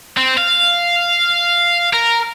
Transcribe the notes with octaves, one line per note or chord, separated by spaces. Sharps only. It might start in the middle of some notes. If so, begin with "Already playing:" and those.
C4
F5
A#4